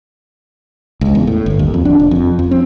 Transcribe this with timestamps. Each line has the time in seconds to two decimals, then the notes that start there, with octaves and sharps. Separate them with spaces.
1.01 C#2
1.15 E2
1.27 A2
1.46 G1
1.59 D#2
1.74 F2
1.85 D4
2.00 F1
2.11 F2
2.39 F2
2.51 C4